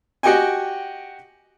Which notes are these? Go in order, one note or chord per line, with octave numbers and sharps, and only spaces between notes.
F#4 G4 D#5 G5 G#5